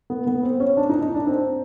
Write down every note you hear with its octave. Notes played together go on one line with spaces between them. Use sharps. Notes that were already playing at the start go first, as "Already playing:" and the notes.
B3
B3
C4
C#4
D4
D#4
D#4
D4
C4